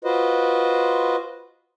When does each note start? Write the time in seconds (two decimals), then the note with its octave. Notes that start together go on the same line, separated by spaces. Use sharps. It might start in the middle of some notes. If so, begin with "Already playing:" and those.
0.04 F4 F#4 B4 C5 D#5